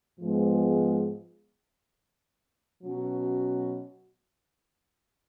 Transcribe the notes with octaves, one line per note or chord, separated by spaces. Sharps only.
G#2 F3 G#3 B3
B2 F#3 C#4 F#4